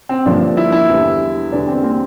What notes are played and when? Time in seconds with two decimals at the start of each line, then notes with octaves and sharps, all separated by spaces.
0.09 C4
0.25 G1 G2 F3 A#3 D4
0.57 E4
0.72 E4
0.88 E2 D3 G3
1.52 E2 D3 G3 D4
1.68 C4
1.80 A#3
1.84 C4